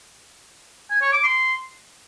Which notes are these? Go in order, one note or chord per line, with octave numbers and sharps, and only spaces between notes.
G#5
C#5
D6
C6